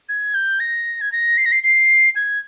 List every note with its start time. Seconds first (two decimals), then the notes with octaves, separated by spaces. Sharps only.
0.09 G#6
0.34 G6
0.60 A#6
1.01 G#6
1.12 A#6
1.37 C7
1.45 A#6
1.52 C7
1.63 C7
2.16 G#6